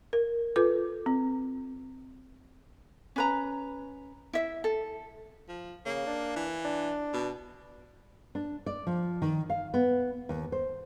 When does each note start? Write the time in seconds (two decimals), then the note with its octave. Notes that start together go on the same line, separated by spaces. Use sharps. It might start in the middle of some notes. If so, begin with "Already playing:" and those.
0.13 A#4
0.56 F4 A4 B4 D6
1.06 C4
3.16 C#4 B4 A#5
4.33 E4 E5
4.64 A4
5.48 F3
5.85 C#3 A#3
6.07 D4
6.36 E3
6.65 D4
7.14 B2
8.35 D4
8.66 D5
8.87 F3
9.22 D#3
9.50 F5
9.74 B3
10.29 D#2
10.52 C5